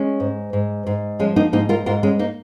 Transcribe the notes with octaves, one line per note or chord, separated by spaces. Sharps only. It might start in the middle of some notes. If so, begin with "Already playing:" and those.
Already playing: G#3 C#4
G#2
G#2
G#2
F3 G#3 C#4
A#3 D#4
G#2 A#3 D#4
F4 A#4
G#2 F4 A#4
G#3 C#4
A#3 D#4